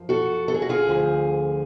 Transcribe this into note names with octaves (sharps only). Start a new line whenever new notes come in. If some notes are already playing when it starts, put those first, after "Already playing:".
Already playing: F#2 F3
F#4 A4
A4
G#4
F#4
F4 G#4
D2 D3 F3